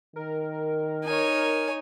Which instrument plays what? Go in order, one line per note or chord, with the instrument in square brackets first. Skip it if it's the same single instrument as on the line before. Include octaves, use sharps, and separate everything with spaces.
[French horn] D#3 [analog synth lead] A#4
[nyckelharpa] D#4 [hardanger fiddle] C#5 G#5